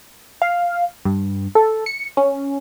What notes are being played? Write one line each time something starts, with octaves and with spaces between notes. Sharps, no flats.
F5
G2
A4
C#7
C#4